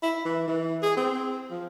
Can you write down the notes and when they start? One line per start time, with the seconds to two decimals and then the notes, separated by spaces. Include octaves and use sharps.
0.03 E4
0.25 E3
0.48 E3
0.82 G#4
0.97 C4
1.51 F3